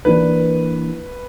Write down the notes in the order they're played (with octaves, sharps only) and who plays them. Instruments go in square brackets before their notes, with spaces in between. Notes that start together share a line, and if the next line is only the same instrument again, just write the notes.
[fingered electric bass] E3 A#3 D4 [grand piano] B4